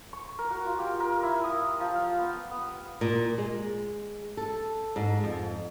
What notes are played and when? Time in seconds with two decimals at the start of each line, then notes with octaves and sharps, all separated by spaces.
0.13 C#6
0.39 A#4
0.50 F#4
0.66 F4
0.79 G4
1.00 A#4
1.23 E4
1.44 D#6
1.80 F3
1.95 F5
2.18 B3
2.51 B3
3.01 A#2
3.38 G#3
4.37 A4
4.96 G#2
5.24 F2